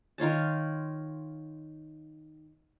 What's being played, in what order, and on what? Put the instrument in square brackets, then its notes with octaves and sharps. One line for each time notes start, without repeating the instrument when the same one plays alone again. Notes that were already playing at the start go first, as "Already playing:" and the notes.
[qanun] D#3 F4 C#5 A5